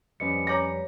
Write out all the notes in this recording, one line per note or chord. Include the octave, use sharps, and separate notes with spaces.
F2 G3 C#4 B4 D#5 C#7
G#4 C#5 A#5 D6 A#6